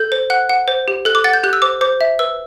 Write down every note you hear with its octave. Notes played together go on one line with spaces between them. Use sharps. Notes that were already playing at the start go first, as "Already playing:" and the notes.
Already playing: A4 G6
C5
F#5 F#6
F#5
C5
G4
A4 F#6
D6
F#5 A6
G6
G4 F#6
E6
C5 D6
C5 D6
E5
B4 E6